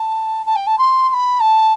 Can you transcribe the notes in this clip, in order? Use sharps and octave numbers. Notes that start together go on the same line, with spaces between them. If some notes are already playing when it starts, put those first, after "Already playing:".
Already playing: A5
A5
G5
A5
C6
C6
B5
A5